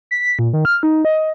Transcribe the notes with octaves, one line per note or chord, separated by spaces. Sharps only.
B6
A#2
D#3
F6
D#4
D#5